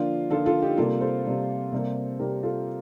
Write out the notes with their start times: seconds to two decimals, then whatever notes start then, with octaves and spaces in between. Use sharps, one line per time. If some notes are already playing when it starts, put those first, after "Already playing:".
Already playing: D3 F3 A#3 D4 F4
0.30 D3 F3 A#3 F4 A4
0.46 F4 A4
0.62 D#4 G4
0.78 C3 G3 A#3 F4 A4
1.01 A4 C5
1.25 C3 G3 A#3
1.72 C3 G3 A#3
2.19 C3 G3 A#3 G4 A#4
2.43 F4 A4